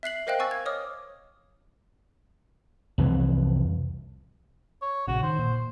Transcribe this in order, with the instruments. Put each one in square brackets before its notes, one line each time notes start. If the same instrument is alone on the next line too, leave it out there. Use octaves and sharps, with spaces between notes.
[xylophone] E5 F#6 C7 F#7
A#4 C5 D#5 F5 G5 F#6
F5 G#5 C#6 E6 A6
G#6
C#5 D#5 D6 D#6 F6
[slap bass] C2 F2 E3
[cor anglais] C#5
[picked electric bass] A#1 C#3 [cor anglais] F#4
[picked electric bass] D#3 [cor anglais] C5
[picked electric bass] A#2